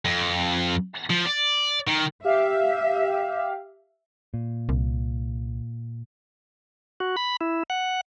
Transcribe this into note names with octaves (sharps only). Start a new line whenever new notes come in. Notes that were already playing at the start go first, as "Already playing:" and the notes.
F2
F3
D5
D#3
G4 E5 F5
A#2
C2
F#4
B5
E4
F#5